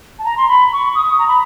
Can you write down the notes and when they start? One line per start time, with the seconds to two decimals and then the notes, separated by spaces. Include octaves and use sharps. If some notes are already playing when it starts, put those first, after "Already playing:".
0.19 A5
0.25 A#5
0.37 C6
0.48 B5
0.73 C#6
0.95 D#6
1.18 A#5
1.28 B5